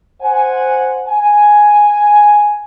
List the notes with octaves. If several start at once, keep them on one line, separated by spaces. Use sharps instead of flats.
C5 F#5 G#5
G#5